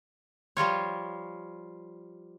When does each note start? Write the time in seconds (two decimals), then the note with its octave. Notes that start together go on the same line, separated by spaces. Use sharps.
0.57 F3 G3 F4 C#5